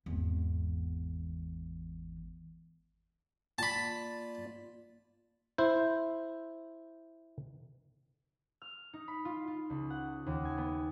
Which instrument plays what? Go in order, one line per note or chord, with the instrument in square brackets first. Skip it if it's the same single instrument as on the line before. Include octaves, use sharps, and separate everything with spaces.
[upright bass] G#1 E2
[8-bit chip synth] A#3 F4 D5 [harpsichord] A5 B5
[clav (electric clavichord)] E4 C5
[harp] F6
D#4
B5
F4
F4
C#2
F#5
D#2
G#5
B3